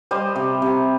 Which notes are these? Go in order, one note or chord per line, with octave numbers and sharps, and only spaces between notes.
G3 C5 D#5
C3
C3